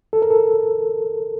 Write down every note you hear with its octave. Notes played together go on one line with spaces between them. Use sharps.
A4
A#4
A4